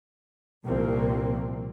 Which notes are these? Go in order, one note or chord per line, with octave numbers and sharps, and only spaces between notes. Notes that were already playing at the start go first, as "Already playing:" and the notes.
C2 A#2 F3 A#3 C4